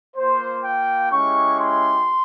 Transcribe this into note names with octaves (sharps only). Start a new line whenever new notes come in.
A#3 F4 C5
G5
G#3 C#4 E4 G4 C#6
C6